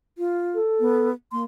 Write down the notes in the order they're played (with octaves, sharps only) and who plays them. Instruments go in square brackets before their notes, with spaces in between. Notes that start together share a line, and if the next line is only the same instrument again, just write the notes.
[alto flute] F4
[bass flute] A4
[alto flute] B3
[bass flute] A#3 [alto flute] C6